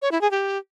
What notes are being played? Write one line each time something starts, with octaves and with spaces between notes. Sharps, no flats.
C#5
E4
G#4
G4